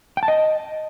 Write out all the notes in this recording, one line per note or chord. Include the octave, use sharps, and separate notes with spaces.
G5
A5
D#5